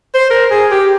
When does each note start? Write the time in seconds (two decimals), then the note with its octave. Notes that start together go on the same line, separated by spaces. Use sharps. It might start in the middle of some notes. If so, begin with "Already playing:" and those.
0.15 C5
0.31 A#4
0.51 G#4
0.71 G4